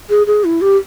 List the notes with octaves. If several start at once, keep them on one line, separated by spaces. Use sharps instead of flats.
G#4
G#4
E4
G4